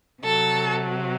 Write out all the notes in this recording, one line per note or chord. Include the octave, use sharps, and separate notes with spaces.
C3 F#3 A4